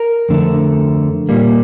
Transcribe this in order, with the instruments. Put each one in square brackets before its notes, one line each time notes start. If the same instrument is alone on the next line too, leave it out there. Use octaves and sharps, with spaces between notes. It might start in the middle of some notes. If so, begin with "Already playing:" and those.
Already playing: [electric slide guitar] A#4
F2 D3 A3
A#2 G3 A#3